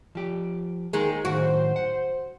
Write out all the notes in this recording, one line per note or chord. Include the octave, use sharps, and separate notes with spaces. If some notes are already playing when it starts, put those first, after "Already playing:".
F3 G4
E2 D#3 G#3 A#3 G#4
A2 D#3 F#3 F#4 C5
F#5